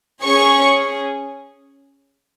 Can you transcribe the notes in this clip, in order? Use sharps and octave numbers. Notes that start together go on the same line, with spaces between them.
C#4 G#4 C#5 C#6